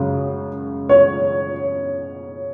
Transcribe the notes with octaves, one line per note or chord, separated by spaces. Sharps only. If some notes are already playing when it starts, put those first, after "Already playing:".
Already playing: F#2 C#3 G#3
C#5